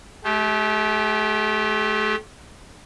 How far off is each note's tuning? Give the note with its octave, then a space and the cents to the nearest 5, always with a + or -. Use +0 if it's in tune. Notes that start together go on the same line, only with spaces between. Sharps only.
A3 -40 G4 +0